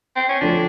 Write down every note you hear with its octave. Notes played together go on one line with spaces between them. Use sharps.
C4
C#4
D3 F3 A3 D4